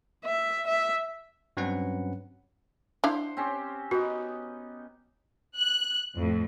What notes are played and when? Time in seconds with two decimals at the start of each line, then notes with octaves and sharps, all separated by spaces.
0.25 E5
0.66 E5
1.57 G2 F#3 C4 C#4 B4 F#5
3.04 D4 E4 C5 F5 F#5
3.37 C4 C#4 G4
3.91 B3 D#4 F#4
5.57 F#6
6.17 F2 A2